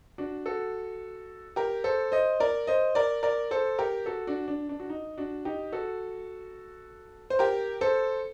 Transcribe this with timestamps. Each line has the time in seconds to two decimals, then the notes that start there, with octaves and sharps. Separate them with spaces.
0.18 D4 F#4
0.46 F#4 A4
1.56 G4 A#4
1.84 A4 C5
2.12 C5 D#5
2.40 A#4 D5
2.67 C5 D#5
2.95 A#4 D5
3.23 A#4 D5
3.51 A4 C5
3.79 G4 A#4
4.06 F#4 A4
4.27 D4 F#4
4.48 D4
4.69 D4
4.80 F#4
4.89 D#4
5.18 D4 F#4
5.45 D#4 G4
5.72 F#4 A4
7.30 C5
7.39 G4 A#4
7.81 A4 C5